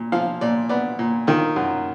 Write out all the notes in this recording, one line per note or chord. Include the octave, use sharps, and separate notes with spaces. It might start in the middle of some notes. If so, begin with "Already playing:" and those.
Already playing: A#2
F3 F5
A#2 D5
B3 D5
A#2
D#3 F4
F#2